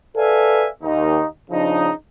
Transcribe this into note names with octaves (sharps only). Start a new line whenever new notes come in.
A4 B4 D5 E5 F5 G#5
D#2 D#4
C#3 F3 D4 D#4